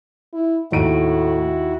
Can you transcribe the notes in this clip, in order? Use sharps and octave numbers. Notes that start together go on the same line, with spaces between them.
E4
D#2 A2 E4 F#4 D7 D#7